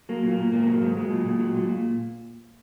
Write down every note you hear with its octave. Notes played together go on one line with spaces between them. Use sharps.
F#3 A#3
A#2
A#3
A#2
G#2 A#3
F#3
G#2
F#3 G#3
A#2
A#2
F#3
A#2
A#2